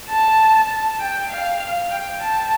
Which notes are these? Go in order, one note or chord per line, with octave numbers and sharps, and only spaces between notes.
A5
G5
F5
G5
A5